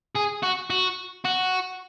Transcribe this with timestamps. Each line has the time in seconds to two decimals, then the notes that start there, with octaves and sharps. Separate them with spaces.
0.15 G#4
0.43 F#4
0.70 F#4
1.25 F#4